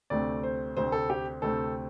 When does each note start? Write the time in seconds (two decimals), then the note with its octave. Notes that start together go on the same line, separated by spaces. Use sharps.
0.10 D2 C3 A3 C4 D5
0.43 C5
0.77 D2 C3 A3 C4 C5
0.92 A4
1.10 G4
1.42 D2 C3 A3 C4 A4